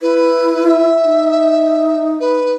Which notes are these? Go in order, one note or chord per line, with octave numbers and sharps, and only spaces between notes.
E4 B4
E5
D#4
B4